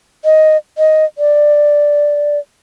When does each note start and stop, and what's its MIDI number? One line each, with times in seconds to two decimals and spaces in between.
0.25 0.57 75
0.78 1.05 75
1.18 2.39 74